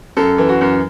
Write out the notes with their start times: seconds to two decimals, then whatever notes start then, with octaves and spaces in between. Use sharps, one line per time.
0.17 F#2 A4
0.38 E3
0.49 F#4
0.61 F#2